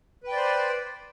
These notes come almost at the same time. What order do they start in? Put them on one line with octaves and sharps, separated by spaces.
B4 G5 D5 C5